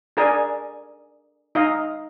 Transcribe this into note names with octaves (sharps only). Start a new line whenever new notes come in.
D4 G#4 A#4 D5 D#5 G#5
D#4 D#5 F5